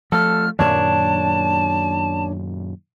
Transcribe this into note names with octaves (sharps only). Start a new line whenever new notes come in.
F3 A3 A4 F6
F#2 A#2 D#3 D4 C#5 A5